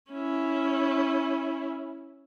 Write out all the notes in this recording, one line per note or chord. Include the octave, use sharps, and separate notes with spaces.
C#4 E4